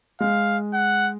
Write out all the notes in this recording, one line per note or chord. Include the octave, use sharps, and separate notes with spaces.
G#3 F5
F#5